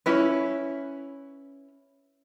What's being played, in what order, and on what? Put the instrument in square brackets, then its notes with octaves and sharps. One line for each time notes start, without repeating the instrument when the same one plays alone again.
[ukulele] C#4 E4 B4